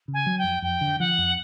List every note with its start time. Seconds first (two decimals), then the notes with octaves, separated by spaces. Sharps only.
0.08 C#3
0.14 G#5
0.26 F#3
0.38 G5
0.44 F2
0.62 F2 G5
0.81 D3
1.00 F3 F#5
1.18 F2